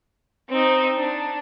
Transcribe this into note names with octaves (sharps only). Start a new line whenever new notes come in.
C4 D#4
D4